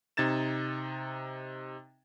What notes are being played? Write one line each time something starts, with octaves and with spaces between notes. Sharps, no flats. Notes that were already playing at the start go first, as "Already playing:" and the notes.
C3 D#4 G#6 A6 E7